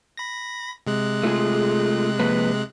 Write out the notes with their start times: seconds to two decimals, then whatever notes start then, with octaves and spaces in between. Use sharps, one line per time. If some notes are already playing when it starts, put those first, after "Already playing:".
0.17 B5 A#6
0.87 C3 G#3 F#6
1.23 A3 F4 G#4
2.19 F3 A#3 B4